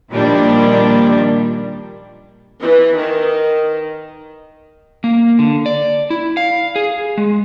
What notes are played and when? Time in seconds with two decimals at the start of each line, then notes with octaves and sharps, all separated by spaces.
0.13 A#2 D#3 F3 G3 A#3 D4
2.62 E3
2.98 D#3
5.04 A#3
5.39 D3
5.66 D5
6.10 E4
6.37 F5
6.76 G#4
7.18 G#3